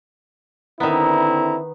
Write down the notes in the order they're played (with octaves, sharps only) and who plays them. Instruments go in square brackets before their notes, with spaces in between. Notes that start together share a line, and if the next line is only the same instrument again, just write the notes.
[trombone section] D3 C4 E4 [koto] D#3 B3 [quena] A#5